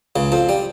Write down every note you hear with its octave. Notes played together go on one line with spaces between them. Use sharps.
C#2 C#3
F2 F3
G3